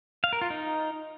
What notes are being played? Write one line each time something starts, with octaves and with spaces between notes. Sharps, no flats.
F5
A#4
F4
D#4